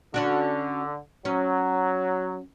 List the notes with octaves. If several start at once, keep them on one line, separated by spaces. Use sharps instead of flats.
D3 C#4 D4 F#4
F#3 C#4